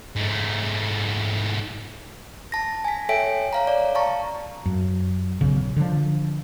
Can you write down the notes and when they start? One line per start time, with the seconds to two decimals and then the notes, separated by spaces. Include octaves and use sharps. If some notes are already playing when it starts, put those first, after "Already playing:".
0.16 G#2 A3
2.52 A5 A#6
2.84 G#5 B6
3.09 A4 C#5 E5 G5 B6 D7
3.53 C#5 F5 A#5
3.67 D5
3.95 F5 A5 A#5 C#6
4.66 F#2
5.41 B1 C#3
5.76 D3 F3